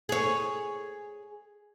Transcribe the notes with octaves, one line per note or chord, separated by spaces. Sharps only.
G#4 C#5